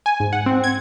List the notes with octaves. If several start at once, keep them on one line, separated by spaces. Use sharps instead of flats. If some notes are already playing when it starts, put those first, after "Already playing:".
G#5
G#2
F#5
C4
G#6